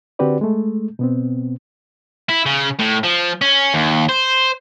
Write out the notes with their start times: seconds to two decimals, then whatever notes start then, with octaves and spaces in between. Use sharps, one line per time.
0.19 D3 C4 F#4 G4 B4 D5
0.41 G#3 A3
0.99 B2 B3 C4
2.29 E4
2.46 C#3
2.79 A2
3.03 F3
3.41 C#4
3.74 D#2
4.09 C5